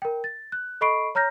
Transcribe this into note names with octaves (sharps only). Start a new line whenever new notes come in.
A#4 G5
A6
F#6
A4 D#5 B5 C#6 C7 D7
C#5 A#5 F6 G6 A#6